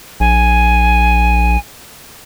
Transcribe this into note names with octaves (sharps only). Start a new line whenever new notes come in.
A#1 G#5